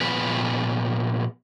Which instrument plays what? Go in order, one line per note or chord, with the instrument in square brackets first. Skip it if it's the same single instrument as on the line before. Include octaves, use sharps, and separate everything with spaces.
[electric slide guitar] A#2 F3 B3 G#4 B4